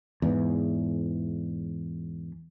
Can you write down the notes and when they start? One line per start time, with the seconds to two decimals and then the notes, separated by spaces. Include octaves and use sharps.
0.22 E2 G#2 E3